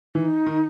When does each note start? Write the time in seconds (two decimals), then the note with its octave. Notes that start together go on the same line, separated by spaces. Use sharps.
0.15 E3 D#4
0.46 D#3